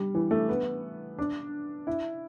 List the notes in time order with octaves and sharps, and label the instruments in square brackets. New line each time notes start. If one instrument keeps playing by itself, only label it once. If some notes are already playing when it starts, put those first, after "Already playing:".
Already playing: [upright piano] G3
E3
A3
B3
D4
E4